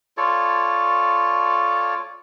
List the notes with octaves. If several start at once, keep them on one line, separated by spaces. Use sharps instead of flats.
F4 A4 C#5 D5